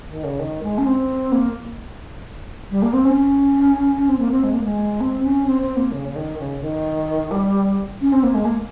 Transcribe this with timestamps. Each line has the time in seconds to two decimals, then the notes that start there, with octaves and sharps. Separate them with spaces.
0.08 D#3
0.24 C#3
0.39 D#3
0.63 G#3
0.78 C#4
0.86 C4
1.32 A#3
2.70 G3
2.82 A#3
2.93 C4
3.05 C#4
4.08 C4
4.19 A#3
4.31 C4
4.43 G#3
4.53 A#3
4.64 G#3
5.00 C4
5.23 C#4
5.46 C4
5.61 C4
5.76 A#3
5.91 C#3
6.08 C#3
6.15 D#3
6.38 C#3
6.61 D#3
7.31 G3
8.01 C#4
8.12 C4
8.23 A#3
8.34 G#3
8.45 A#3